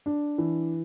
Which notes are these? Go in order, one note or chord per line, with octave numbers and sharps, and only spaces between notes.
D4
E3